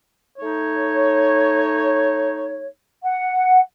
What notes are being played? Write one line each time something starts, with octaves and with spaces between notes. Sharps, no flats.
A3 D#4 C#5
F#5